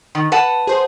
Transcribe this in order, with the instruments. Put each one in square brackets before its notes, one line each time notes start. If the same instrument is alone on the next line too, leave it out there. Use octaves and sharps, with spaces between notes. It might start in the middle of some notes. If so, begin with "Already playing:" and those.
[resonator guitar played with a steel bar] D#3
B4 F#5 A5
[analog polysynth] G#4 C5